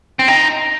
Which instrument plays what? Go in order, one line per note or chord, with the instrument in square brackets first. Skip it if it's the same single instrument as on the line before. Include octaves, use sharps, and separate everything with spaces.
[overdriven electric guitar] C4
D#4